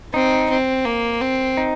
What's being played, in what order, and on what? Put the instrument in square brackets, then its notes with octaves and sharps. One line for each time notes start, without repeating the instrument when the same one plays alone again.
[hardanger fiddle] C4 [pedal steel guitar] D#4
[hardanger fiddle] C4
A#3
C4
[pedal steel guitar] D#4